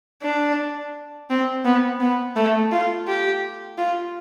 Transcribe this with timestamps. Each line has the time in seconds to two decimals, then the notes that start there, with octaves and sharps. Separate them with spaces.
0.22 D4
1.30 C4
1.65 B3
2.00 B3
2.36 A3
2.72 F4
3.07 G4
3.77 F4